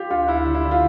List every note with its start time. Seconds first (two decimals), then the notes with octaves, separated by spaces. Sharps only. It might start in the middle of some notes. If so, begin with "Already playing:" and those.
Already playing: F4 G4
0.10 D2 F4
0.28 D2 E4
0.46 D3
0.54 E4
0.64 D3
0.71 F4